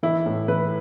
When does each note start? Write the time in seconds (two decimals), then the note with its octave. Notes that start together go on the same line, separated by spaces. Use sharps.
0.03 E3 E4
0.26 A2
0.48 E3 B4